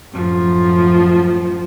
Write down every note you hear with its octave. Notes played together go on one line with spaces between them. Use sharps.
F#2 A2 F3